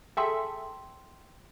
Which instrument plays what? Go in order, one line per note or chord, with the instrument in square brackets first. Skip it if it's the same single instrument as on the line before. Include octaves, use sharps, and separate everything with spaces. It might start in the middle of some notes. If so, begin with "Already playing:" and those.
[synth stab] G#4 A4 E5 [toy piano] G5 C6